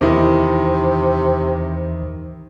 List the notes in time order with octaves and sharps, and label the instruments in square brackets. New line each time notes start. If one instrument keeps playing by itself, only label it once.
[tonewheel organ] E2 [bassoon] C3 [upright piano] D#3 D#4 E4